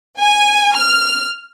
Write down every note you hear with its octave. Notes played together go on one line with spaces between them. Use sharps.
G#5
F6